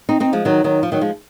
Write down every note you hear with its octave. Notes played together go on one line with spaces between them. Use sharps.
C4 D#4
C4 D#4
F3 G#3
D#3 F#3
D#3 F#3
F3
D#3 F#3
F3 G#3